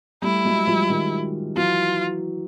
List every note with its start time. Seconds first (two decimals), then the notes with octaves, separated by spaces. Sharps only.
0.22 G3 A3 E4
0.45 F#3 G#3
0.67 F3 G3
0.89 D#3 F3
1.55 E3 F#3 F4